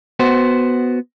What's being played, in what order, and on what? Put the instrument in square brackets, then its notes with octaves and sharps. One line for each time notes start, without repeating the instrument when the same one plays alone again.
[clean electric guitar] B3 F#4 C5